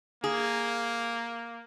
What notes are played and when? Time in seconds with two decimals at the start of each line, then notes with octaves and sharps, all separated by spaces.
0.24 A#3 G#4